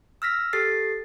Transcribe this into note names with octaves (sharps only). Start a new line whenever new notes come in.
E6 F6 A#6 B6
G4 A4 A6 C7